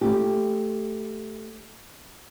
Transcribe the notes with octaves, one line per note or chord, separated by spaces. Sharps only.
A3 G4